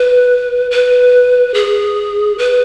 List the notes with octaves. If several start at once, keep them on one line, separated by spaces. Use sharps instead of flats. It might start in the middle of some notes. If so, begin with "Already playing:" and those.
Already playing: B4
B4
G#4
B4